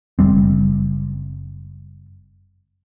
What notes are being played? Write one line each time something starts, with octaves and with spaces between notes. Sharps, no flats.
F#1 F2 G3 C4